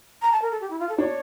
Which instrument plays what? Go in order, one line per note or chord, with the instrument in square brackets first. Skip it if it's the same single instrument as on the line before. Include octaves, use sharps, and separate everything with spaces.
[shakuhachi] A#5
A5
A#4
A4
G4
E4
F4
A4
[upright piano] D4 [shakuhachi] C#5